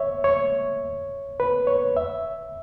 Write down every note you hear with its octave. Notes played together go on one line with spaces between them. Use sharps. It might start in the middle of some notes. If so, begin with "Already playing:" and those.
Already playing: C#5 E5
C#5
B4
C#5
E5